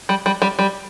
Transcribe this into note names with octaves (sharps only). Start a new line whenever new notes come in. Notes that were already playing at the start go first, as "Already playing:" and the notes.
G3
G3
G3
G3